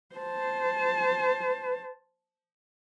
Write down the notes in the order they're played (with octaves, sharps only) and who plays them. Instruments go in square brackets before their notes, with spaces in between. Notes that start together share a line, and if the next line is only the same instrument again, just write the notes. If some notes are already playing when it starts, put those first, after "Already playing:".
[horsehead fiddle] C5 A5